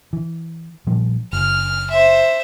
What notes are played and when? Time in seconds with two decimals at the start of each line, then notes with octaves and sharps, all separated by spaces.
0.13 E3
0.87 A#2 F3 G3
1.33 F#1 F6
1.91 C5 E5